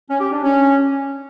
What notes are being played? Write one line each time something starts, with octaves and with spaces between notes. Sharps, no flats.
C#4
G4
D4
C#4